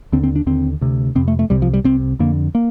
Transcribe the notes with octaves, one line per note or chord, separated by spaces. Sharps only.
D#2 D3 C4
C4
D4
D#2 D3 C4
D2 C3
F2 C3 C4
A3
A3
C2 C3 G3
F3
G3
C2 C3 C4
F2 D3 A#3
A#3